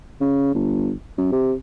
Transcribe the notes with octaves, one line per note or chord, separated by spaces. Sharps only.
C#3
G1
F#2
C3